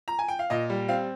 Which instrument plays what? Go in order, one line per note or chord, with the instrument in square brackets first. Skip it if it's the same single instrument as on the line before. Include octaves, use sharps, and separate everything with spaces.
[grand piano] A#5
G#5
G5
F5
A#2 D#5
G3
C4 F5